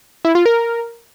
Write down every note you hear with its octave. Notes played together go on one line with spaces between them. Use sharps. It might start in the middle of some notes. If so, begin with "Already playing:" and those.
E4
F4
A#4